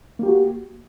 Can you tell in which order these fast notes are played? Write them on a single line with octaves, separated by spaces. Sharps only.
A#3 G4 F#4